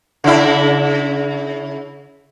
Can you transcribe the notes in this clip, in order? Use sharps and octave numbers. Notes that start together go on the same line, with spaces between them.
C#3 E4